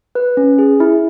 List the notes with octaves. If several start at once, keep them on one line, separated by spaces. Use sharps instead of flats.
B4
C#4
G#4
E4